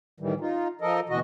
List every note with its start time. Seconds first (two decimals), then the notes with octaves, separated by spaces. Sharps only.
0.20 A2 D#3 E3 G3
0.40 D#4 F4
0.81 F3 A4 A#4 D#5
1.09 D2 B2 E3 F#4 D#5